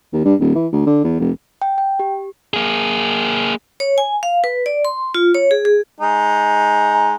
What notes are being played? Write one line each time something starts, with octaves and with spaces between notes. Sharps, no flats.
D#2
G2
D#1
E3
D2
D3
E2
F1
G5
G5
G4
A#3 G#4
C#5
G#5
F5
B4
D5
C6
F4
C#5
G#4
G#4
G#3 D#4 G#4